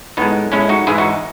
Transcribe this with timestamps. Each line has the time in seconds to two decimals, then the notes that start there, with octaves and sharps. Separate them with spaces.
0.17 A2 G#3 B3 D#4
0.52 A2 G#3 C#4 E4
0.69 D#4 F#4
0.87 G#2 E3 G#3 E4 G#4
0.98 D#4 F#4